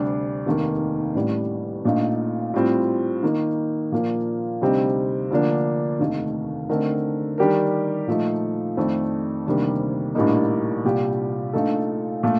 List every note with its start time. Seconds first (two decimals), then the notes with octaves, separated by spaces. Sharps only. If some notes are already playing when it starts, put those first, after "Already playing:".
Already playing: D2 C3 G3 D4
0.46 F1 D#2 D#3 A#3
1.15 A1 A2 G3 D4
1.85 A#1 A#2 A3 D#4
2.54 A2 G3 C4 F4
3.23 D#3 A#3 D#4
3.92 A#2 F3 A#3 D4
4.61 D2 C3 G3 C4 D#4
5.30 D2 D3 F3 A#3 D4
5.99 F1 D#2 D#3 A3 D#4
6.69 D3 A3 C4 D#4 A#4
7.38 D#3 G3 D4 G4 A#4
8.07 A#2 F3 A3 D#4
8.77 F2 D#3 A3 D4
9.46 D2 C3 D#3 G3 A#3
10.15 A#1 A2 G3 A#3 D#4
10.85 C2 A#2 G3 D4 G4
11.53 A#1 A#2 A3 D#4 A4
12.23 A#2 A3